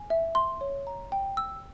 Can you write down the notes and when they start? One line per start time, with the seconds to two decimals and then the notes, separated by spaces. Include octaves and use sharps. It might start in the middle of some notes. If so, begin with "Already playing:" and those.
Already playing: G#5
0.10 E5
0.35 C6
0.61 C#5
0.87 A#5
1.12 G5
1.37 E6